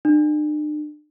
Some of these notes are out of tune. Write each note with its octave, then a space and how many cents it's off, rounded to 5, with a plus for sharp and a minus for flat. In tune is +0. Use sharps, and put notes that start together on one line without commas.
D4 +45